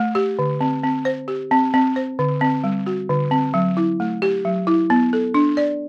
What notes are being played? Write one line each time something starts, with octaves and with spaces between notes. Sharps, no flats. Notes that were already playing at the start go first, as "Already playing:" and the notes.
Already playing: A3
G4
D3
C4
C4
C5
G4
C4
C4
C5
D3
C4
G3
F#4
D3
C4
F#3
E4
A3
G4
F#3
E4
B3
A4
D4
D5